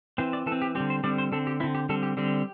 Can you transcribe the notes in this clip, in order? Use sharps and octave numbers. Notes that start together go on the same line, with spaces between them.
E3 C4 C5
D5
E3 A4
C4
G4
D3 G3 C4 G4
C5
D3 G3 C4 D5
C5
D3 C4 A4
G4
D3 C4 E4
G4
D3 G3 C4 A4
G4
D3 G3 C4 G4